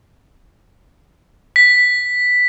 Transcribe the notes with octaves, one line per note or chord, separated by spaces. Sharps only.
B6